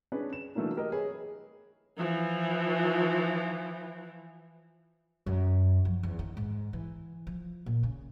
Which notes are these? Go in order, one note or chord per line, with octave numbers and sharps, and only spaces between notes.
C#4 D4 G#4 B4
E7
E3 F#3 A3 A#3 D4 D#4
G4 A#4 D#5
G#4 B4 C#5
E3 F3
F#2
F3
E2
D#3
G#2
E3
F3
A#2
C#3